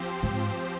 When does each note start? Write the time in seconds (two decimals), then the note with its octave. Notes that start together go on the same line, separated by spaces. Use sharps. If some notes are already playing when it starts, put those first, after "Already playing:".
Already playing: F3 C4 G4 C5
0.23 G#2